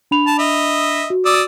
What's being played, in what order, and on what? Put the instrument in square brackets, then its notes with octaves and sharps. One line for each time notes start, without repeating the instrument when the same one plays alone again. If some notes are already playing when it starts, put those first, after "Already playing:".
[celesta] D4 B5 F7
[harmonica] A5
D#5 E5
[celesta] F#4
[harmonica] D5 D#6 E6